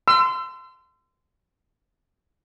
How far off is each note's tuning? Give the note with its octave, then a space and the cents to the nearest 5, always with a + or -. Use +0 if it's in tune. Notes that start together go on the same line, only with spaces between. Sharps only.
C6 -20 E6 +30